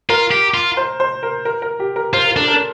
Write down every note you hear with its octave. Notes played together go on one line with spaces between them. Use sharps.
F4 A#4
G4
F4
C5
C5
A#4
A#4
A#4
G4
A#4
F4 C5
A#4
D4 A4
A#4